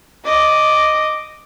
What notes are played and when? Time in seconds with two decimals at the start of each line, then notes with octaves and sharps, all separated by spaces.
0.24 D#5 D6